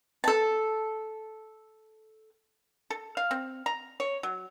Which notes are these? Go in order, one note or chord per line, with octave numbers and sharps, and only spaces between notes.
A4 A5
A4
F5
C4
A#5
C#5
F#3